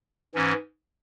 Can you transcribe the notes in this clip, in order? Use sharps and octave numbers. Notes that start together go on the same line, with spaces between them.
G#2 E3 C#4